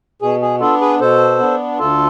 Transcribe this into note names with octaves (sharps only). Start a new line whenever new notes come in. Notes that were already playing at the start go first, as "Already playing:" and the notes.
B2 G#4
G#4
B3 D4 F4 A4
G#4 B4
B2 A4 C5
B3 D4
D2 F4 A4